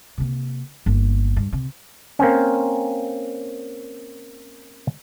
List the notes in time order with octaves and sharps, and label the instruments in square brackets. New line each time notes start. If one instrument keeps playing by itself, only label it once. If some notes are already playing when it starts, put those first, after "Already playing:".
[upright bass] C3 A#3
G1 A#3
G2
C3
[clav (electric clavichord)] A#3 C4 C#4